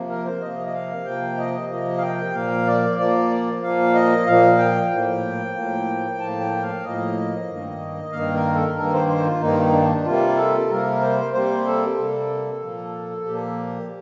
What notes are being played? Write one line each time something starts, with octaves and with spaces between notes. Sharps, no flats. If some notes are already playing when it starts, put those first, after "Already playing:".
Already playing: C3 F3 A#3
A#4
C5
C3 F3 A#3 D#5
D#5
F5
C3 F3 A#3 G5
D#5
C3 F3 A#3 D#5
F5
G5
A#2 F3 A#3 F5
D5
A#2 F3 A#3 D5
A#2 F3 A#3 F5
D#5
A#2 F3 A#3 F5
G5
A2 F3 A#3
A2 F3 A#3
A2 F3 A#3 A5
G5
F5
A2 F3 A#3 D#5
G2 D#3 A#3
G2 D#3 A#3 F5
A#4
A4
G2 D#3 A#3 A#4
C5
C5
F4
G2 D#3 A#3 D#4
D4
C3 G3 A#3 F4
A4
C3 G3 A#3 A#4
C5
C3 G3 A#3 C5
A4
C3 G3 A#3
A#2 F3 A#3
A#2 F3 A#3 G4